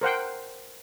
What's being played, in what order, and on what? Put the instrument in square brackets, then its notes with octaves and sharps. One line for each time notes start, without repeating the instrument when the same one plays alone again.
[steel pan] A#4 C5 F#5 G5